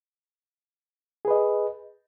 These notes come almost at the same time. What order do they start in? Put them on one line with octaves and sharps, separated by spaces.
G#4 B4 D#5